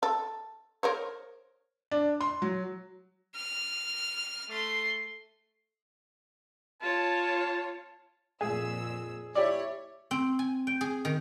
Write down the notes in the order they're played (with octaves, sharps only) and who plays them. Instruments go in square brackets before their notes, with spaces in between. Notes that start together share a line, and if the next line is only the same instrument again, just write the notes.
[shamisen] A4
A#4 C5 C#5
[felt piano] D4
C6
F#3
[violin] F6
A3 C6
[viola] F4 C#5 [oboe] A5
[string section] F2 A#2 E6 [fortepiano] G#4
[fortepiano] E4 G4 D5 [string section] C#5
[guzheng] C4
G#5
G5
G#4
D#3